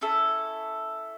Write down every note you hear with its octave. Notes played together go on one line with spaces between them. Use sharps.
C#4 E4 A4